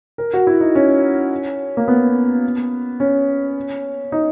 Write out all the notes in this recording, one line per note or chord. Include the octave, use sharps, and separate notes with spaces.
A#4
F#4
E4
D#4
C#4
A#3
B3
C#4
D#4